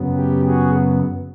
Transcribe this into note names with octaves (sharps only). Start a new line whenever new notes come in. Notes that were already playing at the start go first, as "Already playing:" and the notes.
Already playing: F#2 C#3 F#3 B3
G4
F#4 G#4